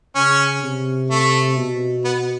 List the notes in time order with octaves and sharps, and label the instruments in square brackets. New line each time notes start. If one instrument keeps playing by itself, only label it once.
[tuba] C#3 [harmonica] C#4
[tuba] C3
[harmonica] A3
[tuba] B2
[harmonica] B3